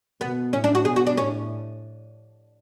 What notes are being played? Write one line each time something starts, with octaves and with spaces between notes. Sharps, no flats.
B2 B3
A2 C#4
D4
F#4
B2 G#4
F#4
D4
A2 C#4